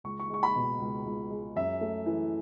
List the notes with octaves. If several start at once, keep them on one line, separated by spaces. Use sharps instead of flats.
C#2 C#6
C#6
G#3 C#6
B5
B2
C#2
C#2
G#3
F#2 E5
A3
E3